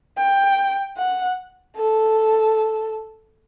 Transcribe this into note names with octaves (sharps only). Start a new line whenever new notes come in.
G5
F#5
A4